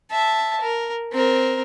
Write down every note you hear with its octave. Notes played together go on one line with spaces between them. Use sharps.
E5 A5
A#4
C4 A#4